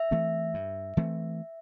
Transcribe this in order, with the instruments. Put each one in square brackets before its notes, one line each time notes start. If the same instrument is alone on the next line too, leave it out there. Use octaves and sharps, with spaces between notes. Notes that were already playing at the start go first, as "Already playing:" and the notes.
Already playing: [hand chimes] E5
[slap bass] E3 A3 C4
G2
E3 A3 C4